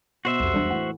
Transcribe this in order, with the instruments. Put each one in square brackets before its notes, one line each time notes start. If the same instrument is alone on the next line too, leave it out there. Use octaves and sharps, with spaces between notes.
[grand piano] B2 [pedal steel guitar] F#4 C5 E5
[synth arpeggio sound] C2 F2 [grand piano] C3 A4
[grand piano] E1 [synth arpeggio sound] G3 D4
[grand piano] A2 E3 [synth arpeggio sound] F#5